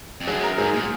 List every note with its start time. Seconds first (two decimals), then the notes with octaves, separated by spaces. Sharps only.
0.20 F2
0.27 F#2 G#4
0.43 A#4
0.58 G#2 G#4
0.74 A#2